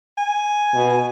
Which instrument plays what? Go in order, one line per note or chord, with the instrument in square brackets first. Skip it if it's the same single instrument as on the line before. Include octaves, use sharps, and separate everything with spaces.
[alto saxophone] G#5
[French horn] B2